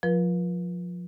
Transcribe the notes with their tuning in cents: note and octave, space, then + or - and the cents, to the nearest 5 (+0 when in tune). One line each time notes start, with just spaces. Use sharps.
F3 +20 F4 +0 B4 -40